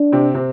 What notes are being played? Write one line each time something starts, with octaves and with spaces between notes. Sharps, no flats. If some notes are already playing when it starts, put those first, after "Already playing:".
Already playing: D4
C3 C4
C3 C4